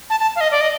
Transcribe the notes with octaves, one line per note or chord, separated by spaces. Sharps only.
A5
A5
F5
D#5
D5
D#5